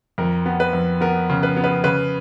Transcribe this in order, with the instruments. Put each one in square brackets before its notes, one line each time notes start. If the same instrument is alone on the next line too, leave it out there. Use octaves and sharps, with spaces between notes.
[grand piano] F2 A#4
B3
B4
F2
B3 A#4
C#3
B4
B3
B4
C#3 B4